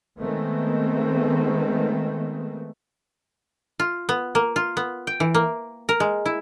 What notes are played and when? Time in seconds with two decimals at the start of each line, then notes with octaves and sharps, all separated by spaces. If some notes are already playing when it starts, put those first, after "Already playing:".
0.19 D#3 G#3 A3 B3 C4
3.79 F4
4.09 B3
4.35 A#3
4.56 F4
4.77 B3
5.07 G5
5.20 E3
5.34 A#3
5.89 A#4
6.00 G#3
6.26 E4